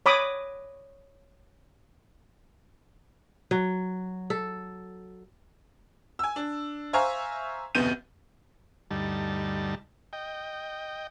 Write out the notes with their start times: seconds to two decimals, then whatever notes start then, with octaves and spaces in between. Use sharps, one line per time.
0.06 C#5 B5 D6 D#6
3.51 F#3
4.30 A4
6.19 G#5 E6
6.36 D4
6.93 C5 E5 F5 G#5 A#5 C#6
7.75 F1 D2 B2 B3 G6 D#7
8.91 D2 G2 G3 D#4 A5
10.13 D#5 G5